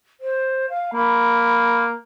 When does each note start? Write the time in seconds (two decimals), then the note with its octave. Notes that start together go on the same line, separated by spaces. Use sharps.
0.20 C5
0.70 F5
0.94 A#3 B5